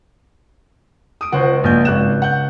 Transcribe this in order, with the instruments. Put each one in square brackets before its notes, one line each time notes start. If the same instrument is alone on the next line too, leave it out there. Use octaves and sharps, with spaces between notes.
[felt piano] D#6 D7
[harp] C#2 [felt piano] C5 F#5
[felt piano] A#1 G6
G#1 F#6 E7
F#5 G6